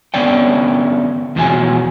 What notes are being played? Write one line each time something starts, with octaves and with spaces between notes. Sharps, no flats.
D3 B3 C#4 D5 G5
E2 B2 F3 F#3 G#5